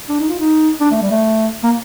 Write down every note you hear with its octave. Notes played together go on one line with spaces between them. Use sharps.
D4
D#4
F4
D#4
D4
A3
G3
A3
A#3